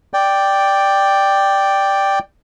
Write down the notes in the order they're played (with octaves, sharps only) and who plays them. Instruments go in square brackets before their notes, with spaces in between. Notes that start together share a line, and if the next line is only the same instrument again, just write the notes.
[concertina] D5 G5